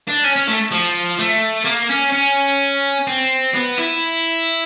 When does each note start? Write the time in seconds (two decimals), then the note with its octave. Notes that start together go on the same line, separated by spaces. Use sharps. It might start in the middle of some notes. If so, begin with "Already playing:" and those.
0.08 D4
0.24 C#4
0.36 C#4
0.48 A3
0.71 F3
1.19 A3
1.65 A#3
1.90 C#4
2.12 C#4
3.07 C4
3.54 B3
3.79 E4